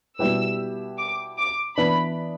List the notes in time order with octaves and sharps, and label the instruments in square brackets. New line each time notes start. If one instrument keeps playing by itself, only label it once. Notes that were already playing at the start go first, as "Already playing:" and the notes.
[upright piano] B2 G3 E4 G4 B4 [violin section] E6
[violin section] D6
D6
[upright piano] E3 B3 D4 B4 [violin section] B5